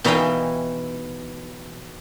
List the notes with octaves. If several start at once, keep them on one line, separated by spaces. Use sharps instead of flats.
B2 E3 D#4 F5 G5 G#5